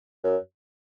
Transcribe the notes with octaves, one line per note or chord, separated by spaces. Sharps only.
F#2